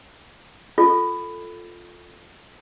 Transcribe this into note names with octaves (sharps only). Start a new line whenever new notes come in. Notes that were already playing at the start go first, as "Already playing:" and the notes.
F4 A4